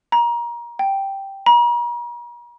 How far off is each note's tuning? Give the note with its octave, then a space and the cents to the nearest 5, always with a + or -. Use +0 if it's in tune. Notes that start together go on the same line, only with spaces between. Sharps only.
A#5 +25
G5 -5
A#5 +45